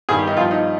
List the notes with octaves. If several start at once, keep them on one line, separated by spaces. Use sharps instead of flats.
G2 D#3 G3 G#4
G4
D#4
G2 F3 F4
D#4